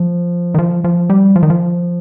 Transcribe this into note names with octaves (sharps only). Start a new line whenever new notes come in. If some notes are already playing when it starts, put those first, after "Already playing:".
Already playing: F3
D#3
F3
F3
G3
F3
D#3
F3